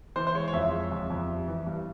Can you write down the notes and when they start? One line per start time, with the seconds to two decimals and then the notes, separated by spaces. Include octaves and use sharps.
0.16 E3 C5
0.27 C5
0.35 G#3 C#5
0.48 C#5
0.53 F2 E5
0.72 G#3
0.92 F2
1.10 F2
1.28 G3
1.48 E3
1.66 G2